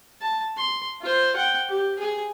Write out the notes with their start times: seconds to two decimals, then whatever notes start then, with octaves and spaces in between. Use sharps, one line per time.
0.21 A5
0.57 C6
1.02 F4 C5
1.36 F#5 G5
1.69 G4
1.99 G#4